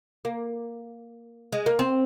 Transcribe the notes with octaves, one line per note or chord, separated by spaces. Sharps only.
A#3
G#3
A#3
C4